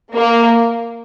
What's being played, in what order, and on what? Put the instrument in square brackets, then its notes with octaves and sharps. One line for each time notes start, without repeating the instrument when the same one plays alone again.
[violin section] A#3